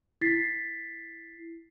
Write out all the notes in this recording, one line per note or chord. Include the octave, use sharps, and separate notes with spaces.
E4 A6 B6 C7